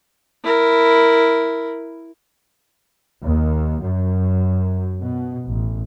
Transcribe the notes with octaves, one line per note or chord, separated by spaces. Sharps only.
E4 A#4
D#2
F#2
B2
A1